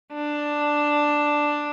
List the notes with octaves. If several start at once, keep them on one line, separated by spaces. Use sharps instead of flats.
D4